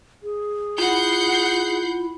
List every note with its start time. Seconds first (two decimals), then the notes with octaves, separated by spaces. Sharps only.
0.23 G#4
0.78 E4 F4 F#5 B5 G6 C7